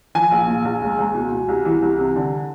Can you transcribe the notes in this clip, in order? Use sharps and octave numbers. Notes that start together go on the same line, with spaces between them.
F3 G#5
A#1
A#2
A#1
C#2
C#2
B2
B2
C2
E3
C2
C3
D3